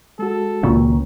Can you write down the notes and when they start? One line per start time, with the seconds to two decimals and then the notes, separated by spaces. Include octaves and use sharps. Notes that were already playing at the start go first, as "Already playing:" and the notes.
0.19 G#3 F#4 A4
0.63 C#2 A#2 D#3 C#4